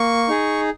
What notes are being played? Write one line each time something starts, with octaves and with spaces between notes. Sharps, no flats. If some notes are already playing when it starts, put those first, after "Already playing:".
Already playing: A#3 C#6
D#4 G#4